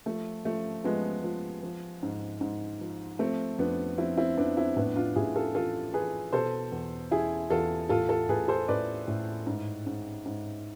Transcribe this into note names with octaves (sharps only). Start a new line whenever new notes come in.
F3 A3
F3 A3
F3 G#3 B3
F3
F3
G#2
G#2
F3
F3 A3 C4
F2 B3 D4
F3 C4 E4
C4 E4
F2 B3 D4
C4 E4
A2 B3 D4
D4 F4
A2 E4 G#4
F4 A4
E3 F4 A4
E3 G#4 B4
B2 A4 C5
E2
E2 E4 G#4
E2 F4 A4
A2 F4 A4
F4 A4
A2 G#4 B4
A4 C5
A2 B4 D5
A2
G#2
G#2
G#2